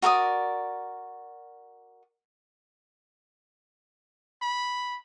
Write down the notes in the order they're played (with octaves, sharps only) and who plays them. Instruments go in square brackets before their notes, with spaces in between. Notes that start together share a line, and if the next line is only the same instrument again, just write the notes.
[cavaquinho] F#4 A#4 D5 D#6
[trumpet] B5